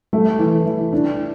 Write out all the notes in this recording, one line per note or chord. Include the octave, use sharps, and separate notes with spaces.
A3
E3
E3
D4